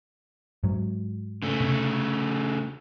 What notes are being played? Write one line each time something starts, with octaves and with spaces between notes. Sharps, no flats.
G#2 F#3
C#3 A3
C3